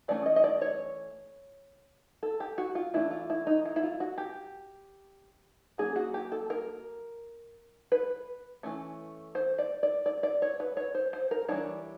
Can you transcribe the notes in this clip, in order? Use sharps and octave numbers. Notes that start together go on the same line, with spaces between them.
E3 A3 C#4 D5
D#5
D#5
D5
C#5
A4
G4
F#4
F4
E3 A3 D4 E4
F4
E4
D#4
E4
E4
F4
F#4
G4
F#3 A#3 C#4 G#4
F#4
G4
A4
A#4
B4
E3 A3 C#4
C5
D5
D5
D5
D5
C#5
B4
C#5
C5
C5
A#4
E3 G3 A#3 D4 C#5